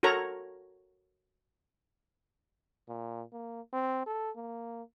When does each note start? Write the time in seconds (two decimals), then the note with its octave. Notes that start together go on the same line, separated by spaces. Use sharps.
0.03 F#4 A4 A#4 C#5 A#5
2.89 A#2
3.33 A#3
3.73 C4
4.07 A4
4.36 A#3